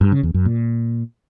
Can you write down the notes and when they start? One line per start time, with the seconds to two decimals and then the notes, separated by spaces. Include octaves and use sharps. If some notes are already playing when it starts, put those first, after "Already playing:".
0.01 G2
0.12 C#3
0.23 E2
0.34 F#2
0.45 A#2